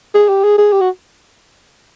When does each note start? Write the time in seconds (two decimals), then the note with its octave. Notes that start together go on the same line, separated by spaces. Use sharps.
0.15 G#4
0.29 G4
0.44 G#4
0.58 G#4
0.72 G4
0.80 F#4